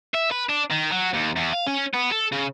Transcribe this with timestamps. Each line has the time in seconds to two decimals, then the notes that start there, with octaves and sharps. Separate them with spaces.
0.14 E5
0.31 B4
0.49 D4
0.71 D#3
0.92 F#3
1.13 D#2
1.36 E2
1.53 F5
1.67 C#4
1.94 B3
2.12 A4
2.32 C#3